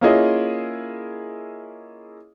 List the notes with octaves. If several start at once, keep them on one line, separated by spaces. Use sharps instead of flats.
A#3 C#4 E4 F4 G#4 D#5